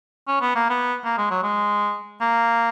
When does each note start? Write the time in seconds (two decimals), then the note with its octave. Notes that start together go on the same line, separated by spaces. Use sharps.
0.28 C#4
0.41 B3
0.55 A#3
0.70 B3
1.05 A#3
1.18 G#3
1.31 F#3
1.43 G#3
2.21 A#3